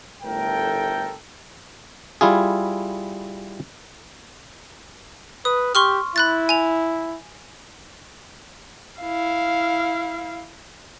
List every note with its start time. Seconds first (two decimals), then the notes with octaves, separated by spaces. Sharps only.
0.23 G1 A2 A3 A4 A#4 G5
2.21 G3 E4 F4 G#4
5.45 B4 D#6
5.75 G4 C6 C#6 F6
6.16 E4 B5 F#6 A6
6.49 G#5 F7
9.01 E4 F5